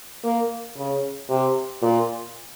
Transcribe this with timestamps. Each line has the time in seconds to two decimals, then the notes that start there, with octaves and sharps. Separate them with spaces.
0.24 A#3
0.77 C#3
1.29 C3
1.82 A#2